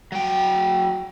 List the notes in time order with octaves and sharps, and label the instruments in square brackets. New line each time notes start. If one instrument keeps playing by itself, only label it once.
[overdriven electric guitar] F#3 G5